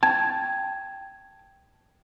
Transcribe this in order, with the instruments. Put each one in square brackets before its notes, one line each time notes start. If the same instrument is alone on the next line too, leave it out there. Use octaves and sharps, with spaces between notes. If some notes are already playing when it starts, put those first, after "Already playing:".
[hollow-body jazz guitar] G5 A5 [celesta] G#6